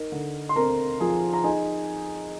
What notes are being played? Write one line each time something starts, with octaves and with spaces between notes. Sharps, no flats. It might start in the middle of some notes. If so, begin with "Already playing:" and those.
Already playing: D#4 A#4
D3
C6
C4 A#4 A#5
F3 G#4 G#5
A#5
D#4 G#4 G#5